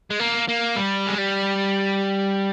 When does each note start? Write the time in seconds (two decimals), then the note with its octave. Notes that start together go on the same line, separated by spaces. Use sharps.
0.10 G#3
0.20 A#3
0.49 A#3
0.76 G3
1.07 G#3
1.19 G3